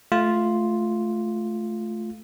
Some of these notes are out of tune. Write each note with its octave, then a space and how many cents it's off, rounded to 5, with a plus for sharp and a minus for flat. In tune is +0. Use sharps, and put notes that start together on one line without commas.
A3 -15 F4 +0